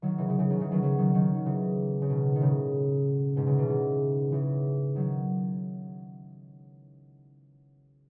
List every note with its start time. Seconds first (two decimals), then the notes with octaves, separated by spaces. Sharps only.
0.02 D#3 F#3
0.18 C#3 E3
0.28 C#3 E3
0.39 C#3 E3
0.50 D#3 F#3
0.60 C#3 E3
0.71 D#3 F#3
0.82 D#3 F#3
0.98 D#3 F#3
1.14 D#3 F#3
1.35 D#3
1.45 C#3 E3
2.02 C#3
2.09 B2 D#3
2.36 D#3
2.41 A2 C#3
3.36 G#2 B2
3.47 C#3 E3
3.58 B2 D#3
3.68 C#3 E3
4.32 C#3 E3
4.95 D#3 F#3